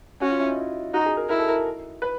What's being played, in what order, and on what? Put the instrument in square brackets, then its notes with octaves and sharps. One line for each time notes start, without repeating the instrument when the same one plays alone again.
[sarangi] C#4 [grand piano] F#4
[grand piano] F4
E4
D#4
E4
[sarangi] D#4 [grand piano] F#4
[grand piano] G#4
A#4
[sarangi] E4 [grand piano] A#4
[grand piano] A4
A#4
B4